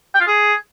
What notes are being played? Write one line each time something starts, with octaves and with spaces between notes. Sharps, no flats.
G5
F4
G#4